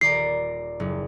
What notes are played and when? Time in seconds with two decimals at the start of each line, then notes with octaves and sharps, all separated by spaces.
0.01 D#1 D5 A#5 C7
0.80 F#1